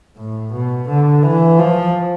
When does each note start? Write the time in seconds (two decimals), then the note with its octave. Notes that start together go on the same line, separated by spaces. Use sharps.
0.16 A2
0.52 B2
0.88 D3
1.23 E3
1.58 F3